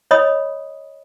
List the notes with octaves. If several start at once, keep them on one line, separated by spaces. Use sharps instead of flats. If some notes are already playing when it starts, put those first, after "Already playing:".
C#5 D#5 B5 D#6